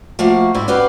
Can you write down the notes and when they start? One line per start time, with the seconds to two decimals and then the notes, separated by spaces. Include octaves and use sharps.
0.19 F3 A3 A#3 F#4
0.54 G#2 G3 E4
0.68 F#4 G4 B4 C#5 D5 F5